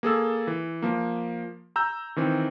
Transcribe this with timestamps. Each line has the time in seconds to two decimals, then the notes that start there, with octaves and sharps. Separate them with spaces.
0.03 A#3 G#4 A4 E6
0.47 E3
0.82 F3 A#3
1.76 A#5 E6 G6
2.16 D#3 E3 C4